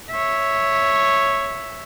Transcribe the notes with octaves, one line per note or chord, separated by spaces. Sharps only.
C#5 E5